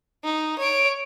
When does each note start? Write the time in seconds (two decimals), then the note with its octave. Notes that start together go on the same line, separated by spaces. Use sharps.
0.24 D#4
0.59 C#5 D7